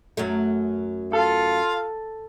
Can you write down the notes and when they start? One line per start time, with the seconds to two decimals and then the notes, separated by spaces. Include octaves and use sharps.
0.17 F#2 F#3 A3
1.13 F4 A4 F5